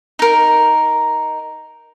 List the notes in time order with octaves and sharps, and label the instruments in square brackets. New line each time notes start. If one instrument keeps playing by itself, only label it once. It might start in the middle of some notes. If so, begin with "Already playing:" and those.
[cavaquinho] D#4 A#4